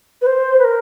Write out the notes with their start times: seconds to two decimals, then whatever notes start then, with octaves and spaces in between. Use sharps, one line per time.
0.22 B4
0.26 C5
0.59 B4
0.64 A#4